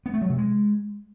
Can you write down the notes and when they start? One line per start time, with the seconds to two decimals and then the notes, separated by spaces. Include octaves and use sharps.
0.06 B3
0.14 A3
0.22 F#3
0.30 C3
0.38 G#3